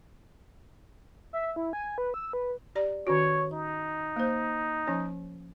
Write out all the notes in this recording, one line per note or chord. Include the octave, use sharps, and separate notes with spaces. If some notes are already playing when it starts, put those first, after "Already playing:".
E5
E4
G#5
B4
E6
B4
G4 D5 A#5
D#3 C#4 F#4 C#5
D#4
A#3 C5
F3 C#4 C#5